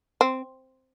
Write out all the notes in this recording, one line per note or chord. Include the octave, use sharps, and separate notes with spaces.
C4